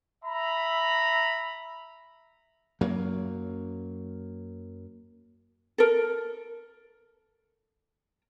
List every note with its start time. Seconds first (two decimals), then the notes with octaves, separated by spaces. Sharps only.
0.25 E5 A#5 B5
2.81 F#2 F#3 A#3
5.78 A4 A#4